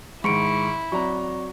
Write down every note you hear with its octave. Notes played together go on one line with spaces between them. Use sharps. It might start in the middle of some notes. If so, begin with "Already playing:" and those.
G#2 D#3 E4 C#6 C#7 D7
F#3 C4 D5 A#5 C#6